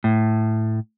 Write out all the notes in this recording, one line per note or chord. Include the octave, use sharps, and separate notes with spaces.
A2